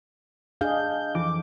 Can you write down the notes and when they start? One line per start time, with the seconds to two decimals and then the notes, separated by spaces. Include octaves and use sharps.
0.61 D4 G#4 D#5 F5 G6
1.15 F2 E3 D6